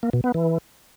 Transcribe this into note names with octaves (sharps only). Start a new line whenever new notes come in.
A#3
B2
B3
E3